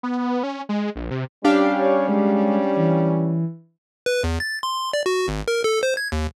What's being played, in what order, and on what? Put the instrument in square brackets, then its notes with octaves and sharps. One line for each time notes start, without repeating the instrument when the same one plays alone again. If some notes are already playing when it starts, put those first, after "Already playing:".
[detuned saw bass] B3
C#4
G#3
A#1
C3
[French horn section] G3 C#4 [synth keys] D4 G4 F5
[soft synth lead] C#5
G#3
E3
[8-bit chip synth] B4
E2
A6
C6
D5
F#4
G#1
A#4
A4
C5
G#6
D#2